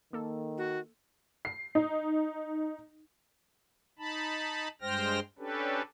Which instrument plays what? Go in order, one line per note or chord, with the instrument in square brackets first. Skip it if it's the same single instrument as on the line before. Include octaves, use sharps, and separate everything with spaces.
[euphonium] D#3 [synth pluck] A#3 A4
[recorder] F#4
[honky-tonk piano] C7
D#4
[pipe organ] D#4 A5 B5
G2 G#3 C5 G5 F6 A#6
C#4 D4 G4 A4 B4